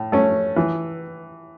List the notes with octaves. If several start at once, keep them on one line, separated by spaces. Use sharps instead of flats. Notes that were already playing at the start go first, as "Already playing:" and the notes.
Already playing: A2
A3 C#4
E3